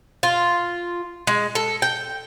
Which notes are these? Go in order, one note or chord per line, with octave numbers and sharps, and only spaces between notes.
F4
G#3
A4
G5